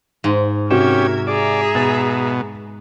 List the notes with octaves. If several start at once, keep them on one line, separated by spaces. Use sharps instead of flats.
G#2
C3 C#4 F#4 G4 A#4 E5 G#6 E7
G#4 D5 E5 A#5
B2 A6